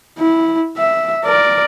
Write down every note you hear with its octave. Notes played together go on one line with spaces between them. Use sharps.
E4
E5
A#4 D5